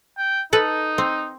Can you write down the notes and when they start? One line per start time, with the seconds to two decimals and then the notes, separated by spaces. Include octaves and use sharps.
0.17 G5
0.53 D#4 A4 B4
0.98 C4